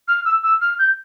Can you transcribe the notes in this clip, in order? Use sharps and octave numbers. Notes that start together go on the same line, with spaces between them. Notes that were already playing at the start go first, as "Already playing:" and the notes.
F6
E6
E6
F6
G6